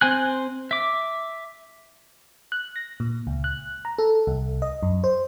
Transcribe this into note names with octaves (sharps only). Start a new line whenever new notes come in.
C4 C5 G#5 F#6
E5 D6
F#6
A#6
A#2
C#2
F#6
A#5
A4
C2
D#5
F#2
C5